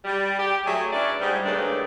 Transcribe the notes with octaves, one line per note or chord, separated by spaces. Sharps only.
G3
G4
F#3 A3 G#4 E5
C#4 D4 E4 B4 D5
G#2 G3
D#2 C#3 E3 A3 D4